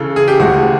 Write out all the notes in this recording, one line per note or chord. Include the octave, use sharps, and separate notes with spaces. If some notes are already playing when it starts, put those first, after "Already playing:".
Already playing: C#3 E3 A4
G#4
G4
D2 C#3 E3 G#3 F#4